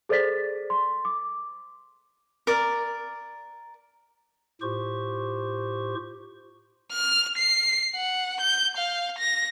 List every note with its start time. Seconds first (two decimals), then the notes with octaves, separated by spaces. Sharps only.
0.09 G#4 A4 C5 D5 A6 B6
0.70 C6
1.05 D6
2.47 A#4 D5
4.62 A2 F4 G4 C5 C#6
6.92 F6
7.38 C7
7.95 F#5
8.41 G6
8.77 F5
9.19 A#6